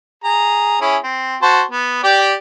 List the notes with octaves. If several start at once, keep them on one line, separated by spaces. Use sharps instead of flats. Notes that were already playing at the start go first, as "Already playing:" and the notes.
G#4 A#5
C#4 E4 G#4
C4
F#4 C5 A5
B3
G4 D5 G5